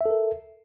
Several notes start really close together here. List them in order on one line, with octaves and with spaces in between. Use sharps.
E5 A4 A#4